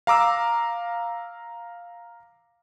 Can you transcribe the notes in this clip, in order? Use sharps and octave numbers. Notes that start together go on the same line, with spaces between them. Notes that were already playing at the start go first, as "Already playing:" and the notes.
F5 A#5 D6 E6